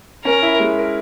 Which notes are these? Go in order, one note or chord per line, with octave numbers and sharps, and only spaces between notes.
C#4 A#4
E4
G#3
A#4